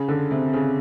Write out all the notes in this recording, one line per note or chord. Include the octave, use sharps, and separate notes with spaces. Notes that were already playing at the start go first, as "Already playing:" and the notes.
Already playing: C#3
D3
C3
C#3